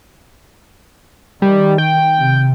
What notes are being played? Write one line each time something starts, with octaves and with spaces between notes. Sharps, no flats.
D#3 G3
G5
C3